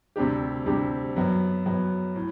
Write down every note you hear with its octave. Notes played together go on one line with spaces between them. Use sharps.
D2 C3 G3 D4 G4
D2 C3 G3 D4 G4
F#2 F#3 B3
F#2 F#3 B3
A2